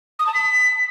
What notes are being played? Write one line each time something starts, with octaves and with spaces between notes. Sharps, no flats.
D#6
A5
B6